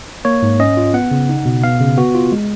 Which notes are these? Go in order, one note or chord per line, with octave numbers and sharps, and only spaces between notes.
A#3 C#5
G#2
C#4 D#5
F4
B3 F#5
C#3
D#4
B2
B3 F5
C#3
B3 F#4
F4
G#3